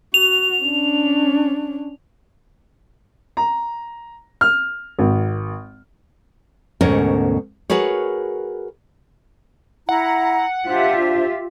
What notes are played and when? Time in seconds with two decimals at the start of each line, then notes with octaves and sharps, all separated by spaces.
0.14 F#4 F7
0.62 C#4 D4
3.37 A#5
4.41 F6
4.99 G#1
6.81 D2 G#2 B2 C#4 A#4 C#5
7.70 F#4 G#4 A#4 B4 C#5
9.89 E4 F#5 A#5
10.66 D4 F4 G4 C5 E5